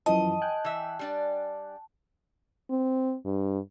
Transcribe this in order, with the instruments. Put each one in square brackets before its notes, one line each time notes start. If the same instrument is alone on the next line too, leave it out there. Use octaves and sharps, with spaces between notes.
[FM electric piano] F#2 E3 F3 [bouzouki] D#5 [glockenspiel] A5
[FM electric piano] G5 G#5 F#6
[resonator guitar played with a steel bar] E3 E5
G3 D4 D5
[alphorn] C4
G2